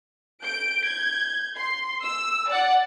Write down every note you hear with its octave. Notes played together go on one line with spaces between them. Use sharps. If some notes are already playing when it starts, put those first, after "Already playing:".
G6 D7
G6 G#6
C6
E6
D5 F#5